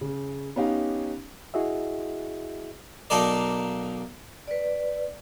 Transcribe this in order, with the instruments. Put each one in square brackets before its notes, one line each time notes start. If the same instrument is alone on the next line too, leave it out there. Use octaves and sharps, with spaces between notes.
[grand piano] C#3
B3 C#4 D#4 G4 F5
[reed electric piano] E4 F#4 G#4 D#5 E5
[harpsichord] B1 A#3 D#4 A4 A#4 D5
[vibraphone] B4 D5